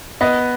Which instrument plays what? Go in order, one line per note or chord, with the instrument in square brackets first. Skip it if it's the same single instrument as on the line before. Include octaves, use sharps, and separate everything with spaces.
[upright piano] B3 D#5